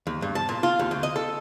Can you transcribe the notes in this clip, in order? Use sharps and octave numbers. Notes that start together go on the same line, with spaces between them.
D#2
G2
A5
A#2
F4
D#2
D2
D#5
A4